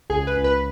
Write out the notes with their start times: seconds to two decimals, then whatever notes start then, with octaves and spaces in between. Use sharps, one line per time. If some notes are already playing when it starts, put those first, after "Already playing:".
0.10 C#2 G#4
0.27 B4
0.37 C#2
0.44 B4